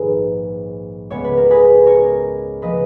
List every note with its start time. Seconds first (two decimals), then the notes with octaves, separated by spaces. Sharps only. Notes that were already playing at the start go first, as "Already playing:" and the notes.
Already playing: A#1 G#2 D#3 G#4 B4
1.10 C#2 C#3 G#3 B3 C#5
1.24 B4
1.37 A#4
1.50 G#4 B4
1.86 A#4 C#5
2.62 C#3 F3 A#3 B4 D#5